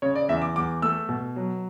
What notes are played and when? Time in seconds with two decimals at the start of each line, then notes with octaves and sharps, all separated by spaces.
0.02 C#3 C#5
0.15 D5
0.29 E2 E5
0.42 D6
0.56 E2 D6
0.82 A3 E6
1.09 B2
1.36 F#3